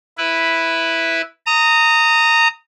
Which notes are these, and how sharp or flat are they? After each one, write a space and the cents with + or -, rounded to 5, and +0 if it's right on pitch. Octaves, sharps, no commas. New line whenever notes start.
E4 +0 B4 +0
A#5 -20 D#6 +5